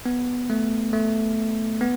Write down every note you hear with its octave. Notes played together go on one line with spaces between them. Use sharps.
B3
A3
A3
B3